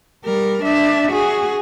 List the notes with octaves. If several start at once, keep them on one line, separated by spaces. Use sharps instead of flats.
G3 A#4
D4 E5
F#4 G#4